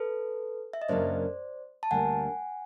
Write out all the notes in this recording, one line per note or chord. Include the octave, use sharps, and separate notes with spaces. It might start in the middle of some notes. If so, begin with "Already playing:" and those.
Already playing: A4 B4
E5
D#5
F#2 C#3 F#3 A#3 D4 C5 D5
A5
D2 D3 G3 A#3 D4 F#5 G#5